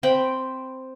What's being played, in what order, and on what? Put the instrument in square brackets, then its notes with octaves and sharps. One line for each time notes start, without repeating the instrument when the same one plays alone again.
[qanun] C4 G5 B5